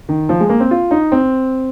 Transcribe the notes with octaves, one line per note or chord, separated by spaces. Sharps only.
D#3
F3
G#3
A#3
C4
F4
D#4
C4